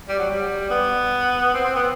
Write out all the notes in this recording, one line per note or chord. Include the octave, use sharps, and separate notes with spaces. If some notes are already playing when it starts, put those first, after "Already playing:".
G3
F#3
G3
B3
C4
C4
B3